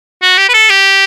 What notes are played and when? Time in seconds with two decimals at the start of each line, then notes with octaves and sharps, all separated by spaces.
0.22 F#4
0.38 G4
0.49 B4
0.54 A4
0.70 G4